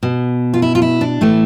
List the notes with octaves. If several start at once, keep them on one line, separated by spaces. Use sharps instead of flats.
B2
F4
E4
F4
E4
D4
A2 E3 A3